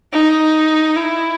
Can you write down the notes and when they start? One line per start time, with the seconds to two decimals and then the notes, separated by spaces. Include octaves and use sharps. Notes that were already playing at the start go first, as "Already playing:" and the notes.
0.12 D#4
0.96 E4